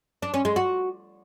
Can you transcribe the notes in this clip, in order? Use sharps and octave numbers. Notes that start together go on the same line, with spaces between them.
D4
C#4
G#3
F#4